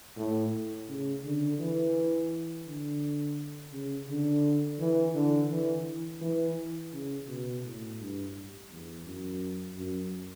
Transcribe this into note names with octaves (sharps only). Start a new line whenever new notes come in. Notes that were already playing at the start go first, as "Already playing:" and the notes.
A2
C#3
D3
E3
D3
C#3
D3
E3
D3
E3
E3
C#3
B2
A2
G2
E2
F#2
F#2